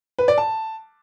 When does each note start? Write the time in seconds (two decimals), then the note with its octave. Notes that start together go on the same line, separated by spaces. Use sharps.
0.19 B4
0.28 D5
0.38 A5